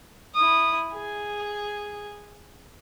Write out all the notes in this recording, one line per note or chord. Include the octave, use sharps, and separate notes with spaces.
E4 D#6
G#4